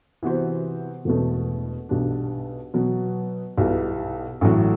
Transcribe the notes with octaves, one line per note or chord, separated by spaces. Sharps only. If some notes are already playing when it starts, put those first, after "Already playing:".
C3 E3 B3 F#4 C5
E1 E2 B2 A3
B1 B2 G3 D4
B2 F#3 B3
B1 B2 G3 B3 E4
A1 A2 F#3